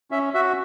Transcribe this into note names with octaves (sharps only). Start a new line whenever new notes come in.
C#4 E5
F#4 E5